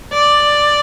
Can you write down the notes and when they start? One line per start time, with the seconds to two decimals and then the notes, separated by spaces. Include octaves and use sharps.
0.13 D5